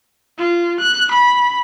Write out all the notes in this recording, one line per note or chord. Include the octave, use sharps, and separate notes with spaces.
F4
F#6
B5